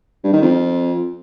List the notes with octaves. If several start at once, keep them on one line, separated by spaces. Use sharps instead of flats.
G2
D#3
F2